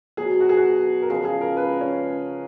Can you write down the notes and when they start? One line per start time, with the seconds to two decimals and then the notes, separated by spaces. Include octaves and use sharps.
0.17 B2 F#3 B3 G#4
0.40 F#4
0.49 G#4
0.57 F#4
1.02 A#4
1.10 C#3 F3 G#3 G#4
1.25 G#4
1.41 A#4
1.57 B4
1.81 C#4